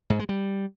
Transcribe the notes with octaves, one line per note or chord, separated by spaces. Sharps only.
G#2
G#3
G3